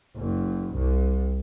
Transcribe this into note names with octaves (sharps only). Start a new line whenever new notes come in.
F#1
C2